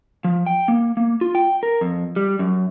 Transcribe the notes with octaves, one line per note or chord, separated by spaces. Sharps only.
F3
G5
A#3
A#3
F4
G5
A#4
F2
G3
F#2